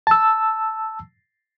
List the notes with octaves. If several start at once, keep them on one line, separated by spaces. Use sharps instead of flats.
A5 E6